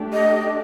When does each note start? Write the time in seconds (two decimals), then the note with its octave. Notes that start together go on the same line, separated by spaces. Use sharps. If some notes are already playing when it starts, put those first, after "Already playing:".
Already playing: A3 D4 G4
0.13 D#5